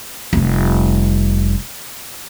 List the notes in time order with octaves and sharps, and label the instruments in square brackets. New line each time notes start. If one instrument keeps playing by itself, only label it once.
[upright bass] F1 G3